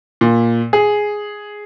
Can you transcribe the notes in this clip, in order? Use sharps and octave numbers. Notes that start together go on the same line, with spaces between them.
A#2
G#4